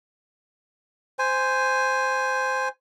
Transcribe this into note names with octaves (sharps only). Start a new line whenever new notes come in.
C5 G#5